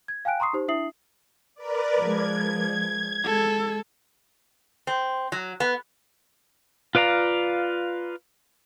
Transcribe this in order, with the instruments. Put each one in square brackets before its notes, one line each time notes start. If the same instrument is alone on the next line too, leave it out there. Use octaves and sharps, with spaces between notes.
[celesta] G#6
F5 G5 G#5 F#6 D7
A#5 C6 C#6 D#6 C7
D#4 G4 C5
D4 E4 E5 D#6 C7 F#7
[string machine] A#4 B4 D5
[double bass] F3 G#3 [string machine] G#6
[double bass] G#3 [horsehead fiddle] A4
[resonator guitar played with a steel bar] C4
F#3
B3
[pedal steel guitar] F4 B4 D5 F5 A#5